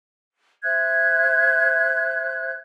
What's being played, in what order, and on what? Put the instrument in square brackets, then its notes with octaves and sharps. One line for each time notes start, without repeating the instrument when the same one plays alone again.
[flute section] C5 E5 F#6 G#6